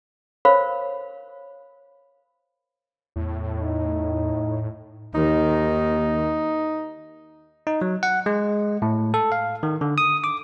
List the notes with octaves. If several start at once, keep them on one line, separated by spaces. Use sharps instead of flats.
A#4 C5 C#5 F5 B5
E2 A2
D#4
D#2 D#3 D#4
D#4
F#3
F#5
G#3
A2
A4
F5
D#3
D3
D#6
D6